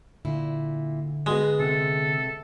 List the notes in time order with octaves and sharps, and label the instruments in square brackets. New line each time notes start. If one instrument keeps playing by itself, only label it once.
[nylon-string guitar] A#2 E4 [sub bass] D3
[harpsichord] G#3 [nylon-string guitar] B3 F#4 G#4
[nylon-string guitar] C3 [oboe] A4